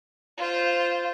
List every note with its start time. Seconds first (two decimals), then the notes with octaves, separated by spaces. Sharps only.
0.37 F4 C5